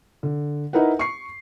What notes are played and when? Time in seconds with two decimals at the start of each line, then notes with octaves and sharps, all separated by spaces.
0.23 D3
0.73 D#4 E4 A#4 B4 F#5
0.99 C#6 C7